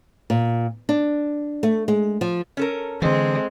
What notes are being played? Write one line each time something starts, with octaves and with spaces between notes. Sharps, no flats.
A#2
D4
A3
G#3
F3
C#4 A4 A#4
D3 E3 G#3 C4 A4